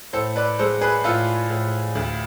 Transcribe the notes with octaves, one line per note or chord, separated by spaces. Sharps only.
A2 A4 C5
B4 D5
G#3 A4 C5
G#4 B4
A2 F4 A4
A2
D2